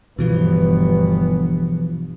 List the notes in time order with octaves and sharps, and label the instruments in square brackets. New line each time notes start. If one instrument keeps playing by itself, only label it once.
[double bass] G1 B3 [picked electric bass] B2 E3 F3